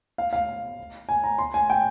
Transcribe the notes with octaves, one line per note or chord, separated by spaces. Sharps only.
F5
F5
G#5
A#5
C6
G#5
G5